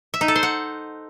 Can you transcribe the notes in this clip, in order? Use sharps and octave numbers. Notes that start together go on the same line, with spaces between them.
E5
D#4
A4
C5
F#5